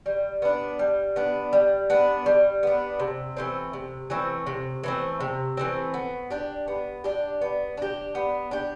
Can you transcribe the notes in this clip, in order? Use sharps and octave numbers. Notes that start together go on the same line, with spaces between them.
G3
B3 D4
G3
B3 D4
G3
B3 D4
G3
B3 D4
C3
E3 A3 C4
C3
E3 A3 C4
C3
E3 A3 C4
C3
E3 A3 C4
B3
D4 G4
B3
D4 G4
B3
D4 G4
B3
D4 G4